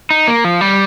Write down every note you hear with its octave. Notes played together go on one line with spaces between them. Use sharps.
D#4
A#3
F3
G3